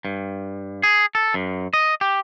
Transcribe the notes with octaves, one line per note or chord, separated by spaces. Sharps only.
G2
G#4
A4
F#2
D#5
G4